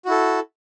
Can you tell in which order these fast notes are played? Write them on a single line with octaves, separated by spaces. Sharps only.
F#4 E4 A4